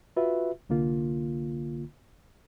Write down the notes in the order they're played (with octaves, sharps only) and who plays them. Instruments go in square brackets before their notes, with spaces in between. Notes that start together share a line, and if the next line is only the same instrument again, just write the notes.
[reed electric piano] F4 F#4 B4 E5
C2 D3 A#3 F4